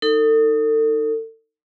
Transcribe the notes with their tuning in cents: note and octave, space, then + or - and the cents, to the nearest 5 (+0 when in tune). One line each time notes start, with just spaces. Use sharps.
D#4 +0 A4 +35